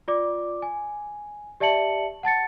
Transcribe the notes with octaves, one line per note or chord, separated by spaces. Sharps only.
F4 D5 D6
G#5
G4 D5 E5 A5 C#7 F#7
F#5 A5 A6 C#7